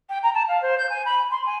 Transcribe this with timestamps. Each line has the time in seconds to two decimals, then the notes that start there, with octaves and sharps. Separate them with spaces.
0.09 G5
0.22 A#5
0.34 A5
0.48 F5
0.62 C5
0.77 G6
0.89 G#5
1.05 B5
1.31 C6
1.45 G#5